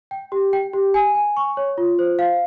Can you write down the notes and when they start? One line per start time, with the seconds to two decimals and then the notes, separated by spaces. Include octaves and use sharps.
0.11 G5
0.32 G4
0.53 G5
0.73 G4
0.94 G#5
1.15 G#5
1.37 C#6
1.57 C#5
1.78 F4
1.99 C5
2.19 F5